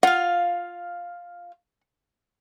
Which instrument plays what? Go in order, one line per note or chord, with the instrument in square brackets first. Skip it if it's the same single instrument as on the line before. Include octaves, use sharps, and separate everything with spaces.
[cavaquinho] F4 F5 [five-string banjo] F#5